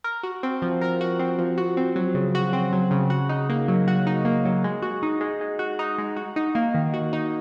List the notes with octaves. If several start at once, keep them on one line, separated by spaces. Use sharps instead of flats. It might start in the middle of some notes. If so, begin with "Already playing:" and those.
A#4
F#4
C4
F3
A#4
F#4
C4
F3
F#4
C4
F#3
C#3
F#4
C4
F#3
C#3
F#4
D#4
A#3
F#3
F#4
D#4
A#3
F#3
G#3
F#4
D#4
G#3
G#3
F#4
D#4
G#3
F#4
D#4
A#3
D#3
F#4
D#4